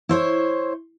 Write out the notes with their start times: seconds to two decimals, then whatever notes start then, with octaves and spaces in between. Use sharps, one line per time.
0.09 E4 C5 C#5